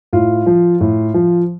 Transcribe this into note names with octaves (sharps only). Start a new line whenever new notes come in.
A2 F4
F3
A2
F3